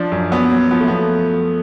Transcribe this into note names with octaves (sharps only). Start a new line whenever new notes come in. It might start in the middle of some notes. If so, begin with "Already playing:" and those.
Already playing: F3 D4
F#2
F#3 B3
F#3
F3 B3
A3
F3 B3